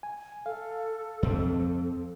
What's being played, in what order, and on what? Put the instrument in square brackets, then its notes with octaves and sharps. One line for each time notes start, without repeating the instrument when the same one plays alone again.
[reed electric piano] G#5
[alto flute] A4 [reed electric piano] F5
[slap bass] F2 C4